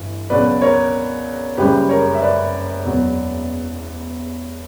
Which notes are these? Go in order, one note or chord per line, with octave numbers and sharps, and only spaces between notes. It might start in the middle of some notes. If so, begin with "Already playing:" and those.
Already playing: G1 G2 E3
C#2 B2 F#3 B4 D5
A#4 C#5
F#1 F#2 C#3 G3 G4 B4
A#4 C#5
E5
B4 D5
E1 E2 B2 F#3